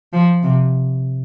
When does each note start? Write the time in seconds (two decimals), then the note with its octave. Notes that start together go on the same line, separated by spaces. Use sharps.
0.13 F3
0.43 C3